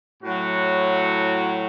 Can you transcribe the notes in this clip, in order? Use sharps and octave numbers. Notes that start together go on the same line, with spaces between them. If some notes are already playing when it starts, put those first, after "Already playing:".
A2 F#3 F#4